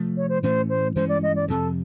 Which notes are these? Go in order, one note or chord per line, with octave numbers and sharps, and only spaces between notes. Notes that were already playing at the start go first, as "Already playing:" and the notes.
Already playing: C3 F3 A3
C#5
C5
A2 E3 A3 C#4 C5
C5
G2 E3 G#3 C#4 C5
D5
D#5
D5
F2 C3 F3 A4